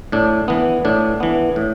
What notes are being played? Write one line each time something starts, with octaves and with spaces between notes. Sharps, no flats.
A2 D4
E3 B3
A2 D4
E3 B3
A2